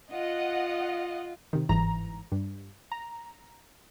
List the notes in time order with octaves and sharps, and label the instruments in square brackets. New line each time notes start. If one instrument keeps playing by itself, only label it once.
[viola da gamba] F4 [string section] D#5 F#5
[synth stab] C3 D#3
G1 G#2 E3 A#5
G2
A#5